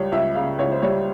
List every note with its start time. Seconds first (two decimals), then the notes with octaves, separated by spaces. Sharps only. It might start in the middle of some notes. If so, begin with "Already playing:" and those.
Already playing: C#2 G3 C#5
0.12 C#2 E5
0.35 C#3 F5
0.59 C#2 C#5
0.71 C5
0.82 G3 C#5